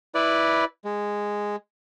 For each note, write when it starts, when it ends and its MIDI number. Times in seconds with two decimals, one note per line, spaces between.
0.15 0.65 64
0.15 0.65 71
0.15 0.65 74
0.85 1.56 56